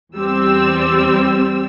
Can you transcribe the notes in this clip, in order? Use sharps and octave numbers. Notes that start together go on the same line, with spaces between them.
E2 G3 C4 E6